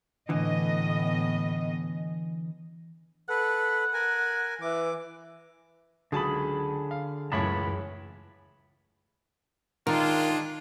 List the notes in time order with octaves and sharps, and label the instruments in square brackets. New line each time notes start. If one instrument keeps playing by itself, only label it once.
[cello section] A2 B3 D#5 [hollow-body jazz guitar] D3 E3
[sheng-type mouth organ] A4 B4 [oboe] F#5
[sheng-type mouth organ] A#4 G#5
[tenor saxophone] E3 [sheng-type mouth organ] D6
[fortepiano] C#2 F#3 A5 [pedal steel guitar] D3 B5 [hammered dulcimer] G#4
[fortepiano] F5
[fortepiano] C#2 A2 C#5 [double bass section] F#2 E3 [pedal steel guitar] A5 B5
[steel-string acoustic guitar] D#3 [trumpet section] G#3 D4 F4 [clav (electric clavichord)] A#4